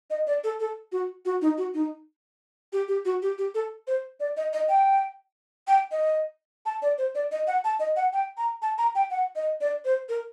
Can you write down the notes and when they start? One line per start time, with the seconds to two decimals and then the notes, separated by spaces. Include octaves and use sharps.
0.10 D#5
0.27 D5
0.44 A4
0.60 A4
0.92 F#4
1.25 F#4
1.42 D#4
1.58 F#4
1.74 D#4
2.73 G4
2.88 G4
3.05 F#4
3.22 G4
3.38 G4
3.55 A4
3.87 C5
4.20 D5
4.37 D#5
4.53 D#5
4.69 G5
5.68 G5
5.92 D#5
6.66 A5
6.82 D5
6.98 C5
7.15 D5
7.32 D#5
7.47 F#5
7.64 A5
7.80 D#5
7.96 F#5
8.13 G5
8.38 A#5
8.62 A5
8.78 A#5
8.95 G5
9.11 F#5
9.36 D#5
9.61 D5
9.85 C5
10.09 A#4